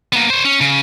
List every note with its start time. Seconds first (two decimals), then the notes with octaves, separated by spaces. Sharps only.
0.13 A#3 B3
0.30 C5 C#5
0.45 C#4
0.61 C#3